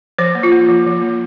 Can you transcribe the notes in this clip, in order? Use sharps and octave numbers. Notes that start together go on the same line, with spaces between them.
F3 C5
A#3
F4
A#3
F3
F3
A#3